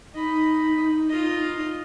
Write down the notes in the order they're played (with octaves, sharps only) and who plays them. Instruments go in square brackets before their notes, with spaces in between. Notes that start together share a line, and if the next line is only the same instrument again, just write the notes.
[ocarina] D#4 [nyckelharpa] D#5 B5
[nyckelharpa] F4 D#5